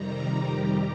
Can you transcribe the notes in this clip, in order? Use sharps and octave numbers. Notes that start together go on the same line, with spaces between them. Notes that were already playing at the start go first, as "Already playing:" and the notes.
Already playing: F2 C3 D#3 G3 A#5
G4